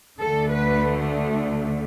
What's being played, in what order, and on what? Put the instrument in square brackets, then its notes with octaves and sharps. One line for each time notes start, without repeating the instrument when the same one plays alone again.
[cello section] D2 D3 A3 A4
B4